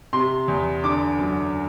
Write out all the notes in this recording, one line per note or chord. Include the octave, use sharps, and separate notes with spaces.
C3 C6
E2
D3 D6
F#2